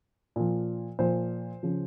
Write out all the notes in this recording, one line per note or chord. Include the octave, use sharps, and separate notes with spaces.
A#2 F3
A#2 F3 C5
C#3 F3